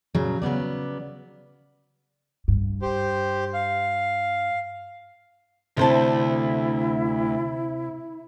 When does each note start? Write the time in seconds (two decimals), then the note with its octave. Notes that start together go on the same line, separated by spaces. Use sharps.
0.15 A#2 C#3 F#3
0.42 C#3 F#3 B3 D5
2.48 G2
2.82 G4 C5
3.54 F5
5.77 D2 C3 E4 C5 A5